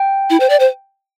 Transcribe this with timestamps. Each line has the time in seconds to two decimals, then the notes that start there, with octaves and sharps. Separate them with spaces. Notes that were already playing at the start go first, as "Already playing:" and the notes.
Already playing: G5
0.30 E4
0.40 C5
0.50 D5
0.60 C5